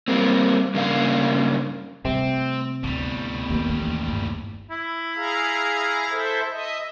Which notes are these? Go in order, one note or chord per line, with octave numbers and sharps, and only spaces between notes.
G3 A#3 C4
G2 C#3 A#3 D4 F5
C3 G3 A3 C4
D2 A2 G3 B3
D#2 B3 C#4
E3 C#4
G1
E4
G#4 F5 A#5
A4 C5 E5
D#5 E5